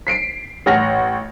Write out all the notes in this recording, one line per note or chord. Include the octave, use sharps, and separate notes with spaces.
B6 C7 D7
A1 F#5 F6 A#6